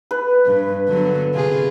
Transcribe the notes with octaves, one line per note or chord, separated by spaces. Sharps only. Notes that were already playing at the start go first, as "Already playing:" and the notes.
B4
G2
D3 F#3 B3
C3 F4 G#4